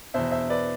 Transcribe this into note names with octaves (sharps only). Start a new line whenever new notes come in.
E2 B2 C5 E5
C5 E5
B4 D5